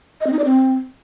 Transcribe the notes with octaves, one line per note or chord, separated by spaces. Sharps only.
D#5
C4
D#4
D5
C4